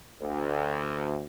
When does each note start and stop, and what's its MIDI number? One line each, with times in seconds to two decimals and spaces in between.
0.22 1.26 38